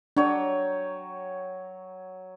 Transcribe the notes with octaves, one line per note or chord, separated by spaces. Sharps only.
F#3 D4 C#5 G5